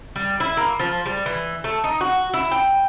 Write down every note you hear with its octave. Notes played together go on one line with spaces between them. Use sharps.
G3
E4
A#3
F3
G3
E3
A3
D#4
F#4
E4
G5